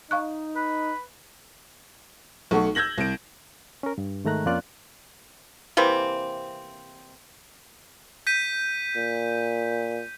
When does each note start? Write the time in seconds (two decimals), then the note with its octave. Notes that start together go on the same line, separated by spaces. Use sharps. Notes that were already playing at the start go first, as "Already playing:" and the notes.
0.11 D#4 F5 C#6 F#6
0.56 B4
2.51 B1 A3 F#5 C#6
2.75 E6 G6 G#6 A#6 F#7
2.98 C2 D7
3.83 C#4 A#4
3.98 G2
4.25 G#2 D#3 A3 A#5 F#6
4.46 F2 A#3 C#4 F4 D5 F#6
5.77 C3 E3 A#3 C4
8.27 G6 B6 D#7
8.96 A#2